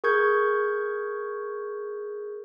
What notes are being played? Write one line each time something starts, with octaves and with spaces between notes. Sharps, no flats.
G#4 A#4 C#6 G6 G#6